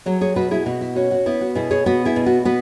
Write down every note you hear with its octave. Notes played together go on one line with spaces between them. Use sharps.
F#3 G#4 C#5
G#4 C#5
B2 F#4 B4
E4 G#4
B2 F#4
E4
C#4 F#4
F#4
B3 E4
F#4
B2 E4 G#4
G#4 C#5
B3 F#4 B4
E4 G#4
B2
F#4
B3 F#4 B4